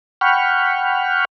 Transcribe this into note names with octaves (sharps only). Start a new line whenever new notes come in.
F#5 G5 B5 C#6 F6